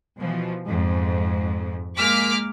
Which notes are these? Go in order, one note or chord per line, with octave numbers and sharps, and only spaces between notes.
B2 E3 F3
F2 G#2
G#3 A#3 D6 F6 B6